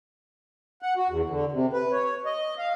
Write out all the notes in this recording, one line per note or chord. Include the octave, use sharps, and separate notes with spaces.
F#5
F#4
E2
D3
C3
B4
C#5
D#5
F5